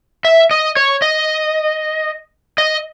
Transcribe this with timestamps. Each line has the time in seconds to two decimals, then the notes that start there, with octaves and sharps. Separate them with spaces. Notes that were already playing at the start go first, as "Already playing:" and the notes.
0.25 E5
0.51 D#5
0.77 C#5
1.02 D#5
2.58 D#5